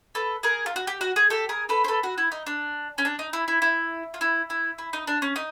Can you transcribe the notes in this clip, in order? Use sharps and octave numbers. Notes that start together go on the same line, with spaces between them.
A4 B4
G#4 A#4
F4
F#4
G4
F#4
G#4
G4 A4
G#4 A#4
A4 B4
C5
A4 B4
F#4
E4
D#4
D4
C#4
D4
D#4
E4
E4
E4
F4
E4
E4
E4
D#4
D4
C#4
D#4